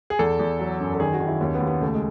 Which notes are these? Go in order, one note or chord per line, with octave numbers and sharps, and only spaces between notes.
G#4
E2 A4
E2
F#3
F#2
A4
D#3 G#4
F#4
D#3
E4
D#2 C#4
B3
D#2
B3
C#2 A3
G#3